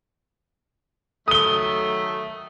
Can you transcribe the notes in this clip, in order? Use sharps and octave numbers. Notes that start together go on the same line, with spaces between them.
D#3 F#3 A3 D#6 G7